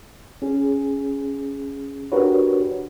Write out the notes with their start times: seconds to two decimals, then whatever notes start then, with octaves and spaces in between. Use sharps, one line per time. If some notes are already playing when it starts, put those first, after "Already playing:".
0.42 C#4 G#4
2.12 D4 F#4 G4 A#4 B4 C#5